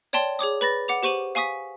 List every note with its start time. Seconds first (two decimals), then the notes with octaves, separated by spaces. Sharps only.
0.13 C#5 D5 G5 A5 C6
0.39 G#4 C#5 D6 D#6
0.61 B4 B5 A6 A#6
0.88 F#5 D6 F7
1.03 G4 C5 C#6 D#7 F#7
1.35 F5 G#5 C#6 D#6 B6